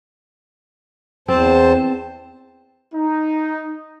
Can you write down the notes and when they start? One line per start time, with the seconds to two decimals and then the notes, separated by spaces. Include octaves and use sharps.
1.28 E2 C4 C5 A5
2.95 D#4